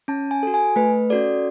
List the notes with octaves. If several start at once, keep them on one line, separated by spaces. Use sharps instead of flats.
C#4 A5
G#5
F#4 A4
G#5
A3 B4
C#4 F#4 A4 D5